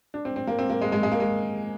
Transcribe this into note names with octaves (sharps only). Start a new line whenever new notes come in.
D4
C4
C4
A#3
C4
A#3
G#3
G#3
G#3
A#3
G#3